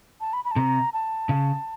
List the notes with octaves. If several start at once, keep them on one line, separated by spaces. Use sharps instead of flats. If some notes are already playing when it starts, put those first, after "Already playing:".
A5
B5
B5
A5
C3 A#5
A5
C#3